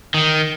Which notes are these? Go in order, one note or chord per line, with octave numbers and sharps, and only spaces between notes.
D#3